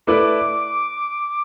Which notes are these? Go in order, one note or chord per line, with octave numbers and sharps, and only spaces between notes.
A3 E4 B4 D5 D6